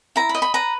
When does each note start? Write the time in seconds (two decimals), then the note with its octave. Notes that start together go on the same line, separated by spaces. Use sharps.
0.16 E4 A#5
0.29 B5
0.35 D#5
0.42 B5
0.54 B4 A#5